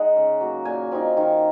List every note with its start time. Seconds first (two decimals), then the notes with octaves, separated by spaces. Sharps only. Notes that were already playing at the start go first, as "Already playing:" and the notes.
Already playing: G#3 D#4 F#5
0.16 C#3
0.41 F#3 A#3
0.65 A#2 G#5
0.92 F3 C4 D#4
1.17 D#3